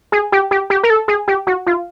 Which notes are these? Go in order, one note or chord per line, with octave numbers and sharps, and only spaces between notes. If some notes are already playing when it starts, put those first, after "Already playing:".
G#4
G4
G4
G4
A#4
A4
G#4
G4
F#4
F4